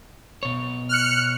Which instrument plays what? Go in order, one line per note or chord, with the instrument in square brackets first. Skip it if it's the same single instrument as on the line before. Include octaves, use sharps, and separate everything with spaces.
[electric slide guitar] B2 C#5
[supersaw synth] F6 F#6 C#7